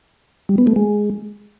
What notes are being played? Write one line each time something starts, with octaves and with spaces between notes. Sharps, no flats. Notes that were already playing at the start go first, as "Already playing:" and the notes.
G3
B3
A3
G#3